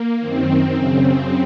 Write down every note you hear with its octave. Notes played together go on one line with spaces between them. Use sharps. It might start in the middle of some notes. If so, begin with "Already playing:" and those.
Already playing: A#3
F#2 D#3 C4
F#2 C#3